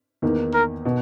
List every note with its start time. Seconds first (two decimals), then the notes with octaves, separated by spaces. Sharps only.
0.22 E2 D#3 A#3
0.54 A#4
0.85 B2